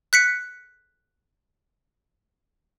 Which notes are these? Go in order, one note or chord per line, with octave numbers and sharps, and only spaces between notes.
F#6 B6 C#7